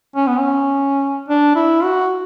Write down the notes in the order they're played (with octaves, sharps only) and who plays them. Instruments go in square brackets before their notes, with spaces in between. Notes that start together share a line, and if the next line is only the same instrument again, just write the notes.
[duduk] C#4
B3
C#4
D4
E4
F#4